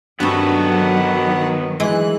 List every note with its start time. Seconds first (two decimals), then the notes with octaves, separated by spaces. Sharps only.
0.20 G2 D#3 F#3 B3 C4 F#4 A4
1.80 E3 G#3 F#6